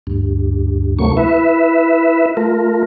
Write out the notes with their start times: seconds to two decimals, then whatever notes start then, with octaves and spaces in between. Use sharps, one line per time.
0.07 D2 G2
0.99 D2 C3 F#3 A3 A#3 C#6
1.17 E4 B4 E5
2.37 A3 F4 A#4